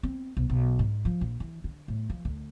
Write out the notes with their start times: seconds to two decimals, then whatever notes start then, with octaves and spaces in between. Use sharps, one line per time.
0.03 C4
0.37 B1
0.50 B1
0.79 G#2
1.05 F3
1.21 A#1
1.40 E3
1.64 D3
1.88 A2
2.10 F3
2.25 D2